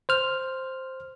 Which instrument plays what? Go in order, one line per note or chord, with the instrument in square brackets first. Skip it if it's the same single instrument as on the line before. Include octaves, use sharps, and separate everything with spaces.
[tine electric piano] C5 F6